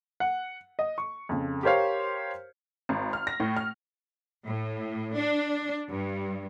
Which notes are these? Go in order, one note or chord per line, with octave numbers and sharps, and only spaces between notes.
F#5
D#5
C#6
F2 C#3
G4 A#4 C5 C#5 F5
G#1
F6
A#6
A2
F6
A2
D4
G2